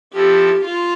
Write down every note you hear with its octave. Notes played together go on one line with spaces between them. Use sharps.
F3 C4 E4 G4 A4
F4